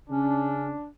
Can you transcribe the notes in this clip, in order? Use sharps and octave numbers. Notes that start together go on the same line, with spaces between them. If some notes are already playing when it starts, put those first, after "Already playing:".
C#3 C#4 D4